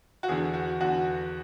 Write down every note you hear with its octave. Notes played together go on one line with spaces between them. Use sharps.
F#4
E2 D3 G#4
F#4
E2 D3 F#4